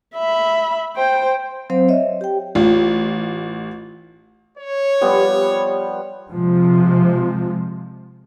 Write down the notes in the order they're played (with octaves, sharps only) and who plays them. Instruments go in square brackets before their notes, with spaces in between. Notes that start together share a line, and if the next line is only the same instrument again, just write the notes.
[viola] E5 B5
C5 G5
[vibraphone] F#3 C4 C5 F5
C#5 D#5 E5
G4 G5
[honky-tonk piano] A1 F4
[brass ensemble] C#5
[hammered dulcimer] F3 G3 B3
[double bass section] C3 F3 G#3